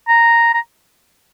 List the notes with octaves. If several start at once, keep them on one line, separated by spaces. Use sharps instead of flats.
A#5
A#5